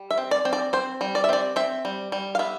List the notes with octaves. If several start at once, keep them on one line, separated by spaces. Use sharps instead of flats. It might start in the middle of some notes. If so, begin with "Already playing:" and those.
Already playing: G3
E5
C4
D5
C4
D5
C4 C5
G3
D5
E5
C4 D5
C4 E5
G3
G3
F5
B3 E5